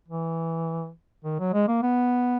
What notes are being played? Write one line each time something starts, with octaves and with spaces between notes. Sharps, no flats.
E3
D#3
F#3
G#3
A#3
B3